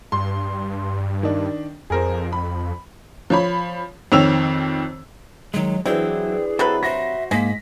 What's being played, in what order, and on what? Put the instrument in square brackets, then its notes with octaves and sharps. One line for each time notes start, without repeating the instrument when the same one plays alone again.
[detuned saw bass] G2 [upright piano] C6
[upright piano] D#3 D4
[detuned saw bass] F2 [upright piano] G#4 A#4 C5
[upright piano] B5
[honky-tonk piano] F3 C#5 B5
F2 D#3 C4 C#5 E6 F7
[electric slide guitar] D#3 G#3 [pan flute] F#3
[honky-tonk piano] E3 D4 [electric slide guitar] F#3 E4 [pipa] C4 [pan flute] G#4
[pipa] C3 F#3 B4 [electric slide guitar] A4
[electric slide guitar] F#4 C5 [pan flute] E5 [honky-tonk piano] A#6
[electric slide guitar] G#2 [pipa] G#3 [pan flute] A#3 [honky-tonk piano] A#6 B6